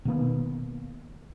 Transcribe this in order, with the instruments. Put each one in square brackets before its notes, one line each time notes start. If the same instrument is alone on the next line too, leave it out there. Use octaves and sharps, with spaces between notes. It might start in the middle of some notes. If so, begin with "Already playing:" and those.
[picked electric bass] B2 D#3 A#3 B3